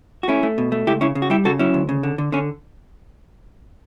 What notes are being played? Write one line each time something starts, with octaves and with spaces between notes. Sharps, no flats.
F#4
A3 C#4 E4
A3
B2
A3
C#2 E4 G4
C#3 C#4 E4
C#3
F#4
G3 E4 G4
C#3 F#4 A4
F#3 C#4 E4
D2
C#3
D3
D3
D3 C#4